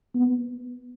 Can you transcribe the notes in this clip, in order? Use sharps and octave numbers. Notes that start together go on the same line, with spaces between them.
B3